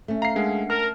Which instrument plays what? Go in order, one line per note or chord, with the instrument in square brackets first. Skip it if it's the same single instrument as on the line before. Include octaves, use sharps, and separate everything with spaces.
[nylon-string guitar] A3 C#4
[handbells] F5 [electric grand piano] A#5 C7
[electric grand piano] G#3 [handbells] D4 A#4 F#5
[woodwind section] A#4 [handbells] A5 [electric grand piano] F6